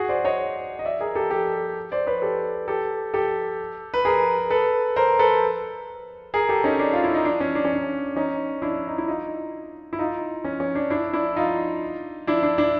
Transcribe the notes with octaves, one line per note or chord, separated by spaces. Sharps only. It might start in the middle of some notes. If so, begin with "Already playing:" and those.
Already playing: F#4 G#4
C5 D5
C#5 D#5
D#5
D5 E5
G#4 A#4
G4 A4
G4 A4
C5 D5
B4 C#5
G4 A4
G4 A4
G4 A4
B4
G#4 A#4
A4 B4
A#4 C5
A4 B4
G#4 A#4
G4 A4
C#4 D#4
D4
F4
E4
D#4
D4
C#4
D4
C#4
D4
C#4 D#4
D4 E4
D#4
E4
D#4 F4
E4
D#4 F4
C#4
C#4
D4
D4 E4
D4 E4
D#4 F4
D4 E4
D4
D4 E4